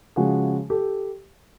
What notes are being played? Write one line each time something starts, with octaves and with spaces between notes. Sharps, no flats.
C#3 F3 G#3 F#4 G#4
G4 A4